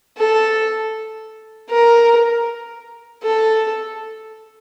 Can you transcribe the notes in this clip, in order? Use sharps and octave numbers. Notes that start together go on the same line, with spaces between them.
A4
A#4
A4